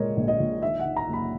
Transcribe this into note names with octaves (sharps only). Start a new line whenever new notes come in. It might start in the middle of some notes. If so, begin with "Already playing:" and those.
Already playing: A#2 G#3 A#4 C#5 D#5
A#1
D#5
A#1
D#3 E5
F#5
D#3
A#5
F#1
B5